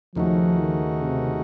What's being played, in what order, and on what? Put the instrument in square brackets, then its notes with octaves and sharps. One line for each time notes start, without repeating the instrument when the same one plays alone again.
[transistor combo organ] D#2 C#3 A3 D#4 F#4 [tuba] F3
[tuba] D#3
C3